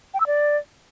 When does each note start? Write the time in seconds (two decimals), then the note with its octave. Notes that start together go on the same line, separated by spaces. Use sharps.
0.14 G5
0.20 E6
0.27 D5